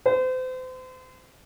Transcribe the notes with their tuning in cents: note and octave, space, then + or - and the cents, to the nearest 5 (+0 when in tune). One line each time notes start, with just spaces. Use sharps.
C5 -35